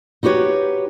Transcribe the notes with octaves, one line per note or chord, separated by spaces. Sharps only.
D#4 F#4 G4 B4 C#5